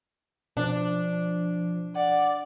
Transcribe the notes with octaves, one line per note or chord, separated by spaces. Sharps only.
B2 F3 D4
D5 F#5